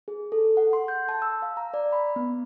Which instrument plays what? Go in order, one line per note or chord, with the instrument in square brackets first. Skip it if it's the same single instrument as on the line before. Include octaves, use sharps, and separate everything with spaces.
[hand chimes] G#4
A4
F#5
C6
G6
A5
E6
F5
A#5
D5
B5
B3